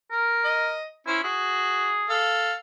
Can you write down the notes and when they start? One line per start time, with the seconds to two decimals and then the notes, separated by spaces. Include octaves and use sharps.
0.12 A#4
0.45 D#5
1.07 C#4 E4 C5
1.24 F#4 G#4
2.10 A4 F5